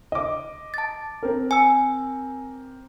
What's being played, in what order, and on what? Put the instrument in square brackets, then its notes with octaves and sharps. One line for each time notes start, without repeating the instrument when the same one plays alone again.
[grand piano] D#5 D6
[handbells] A5 A6
[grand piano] C4 A#4
[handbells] G#5 E6